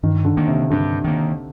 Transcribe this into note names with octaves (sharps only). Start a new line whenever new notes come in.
G2 D#3
D3
D#3 A#3
C3
G2 D3
D#3 A#3